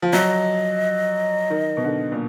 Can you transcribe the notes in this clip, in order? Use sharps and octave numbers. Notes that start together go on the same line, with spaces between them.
F3
F#3 D#5
D#3
B2
D3
A#2